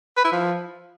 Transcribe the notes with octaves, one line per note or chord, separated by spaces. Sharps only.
B4
E4
F3